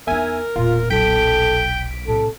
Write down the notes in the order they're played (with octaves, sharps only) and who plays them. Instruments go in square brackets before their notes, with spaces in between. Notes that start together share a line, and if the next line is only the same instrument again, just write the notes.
[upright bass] E2 D#4 [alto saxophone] A#4 [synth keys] E5 G#5
[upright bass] E1 A#2 [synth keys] F4
[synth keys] B1 B6 D7 [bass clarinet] A4 [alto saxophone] G5
[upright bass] A2 C3 [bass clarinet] A4